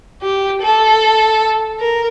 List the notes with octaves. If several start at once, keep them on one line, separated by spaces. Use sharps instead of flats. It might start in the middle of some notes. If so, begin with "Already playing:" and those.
G4
A4
A#4